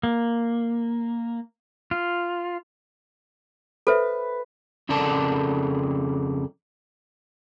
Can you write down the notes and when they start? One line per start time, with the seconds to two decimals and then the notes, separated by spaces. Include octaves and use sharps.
0.03 A#3
1.91 F4
3.87 A4 B4 C5 E5
4.89 F2 C#3 A4 A#4 D5 A5